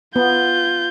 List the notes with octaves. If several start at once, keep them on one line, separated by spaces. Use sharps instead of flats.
B3 F4 G6